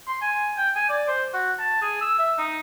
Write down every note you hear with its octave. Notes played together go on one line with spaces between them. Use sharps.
C6
G#5
G5
G#5
D5
C5
F#4
A5
G#4
E6
E5
D#4